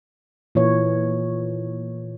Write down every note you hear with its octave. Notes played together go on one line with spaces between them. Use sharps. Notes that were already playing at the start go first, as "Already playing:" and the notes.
A#2 E3 C#5